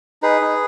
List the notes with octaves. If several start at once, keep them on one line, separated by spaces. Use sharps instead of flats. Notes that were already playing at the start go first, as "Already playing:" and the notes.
D#4 G#4 B4
D#4